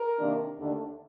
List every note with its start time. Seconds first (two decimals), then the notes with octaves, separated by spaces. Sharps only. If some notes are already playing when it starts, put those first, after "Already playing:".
Already playing: A#4
0.19 C3 D#3 A#3 D4
0.57 D#2 D3 A3 D4